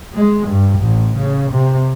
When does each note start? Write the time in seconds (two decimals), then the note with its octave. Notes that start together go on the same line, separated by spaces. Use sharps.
0.15 G#3
0.48 G2
0.80 A1
1.18 C#3
1.52 C3